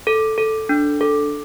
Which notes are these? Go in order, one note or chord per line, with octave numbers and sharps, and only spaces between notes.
A4
A4
D4
A4